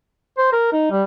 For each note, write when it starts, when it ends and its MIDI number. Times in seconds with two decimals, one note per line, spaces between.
0.38 0.51 72
0.52 0.72 70
0.72 0.87 63
0.91 1.03 55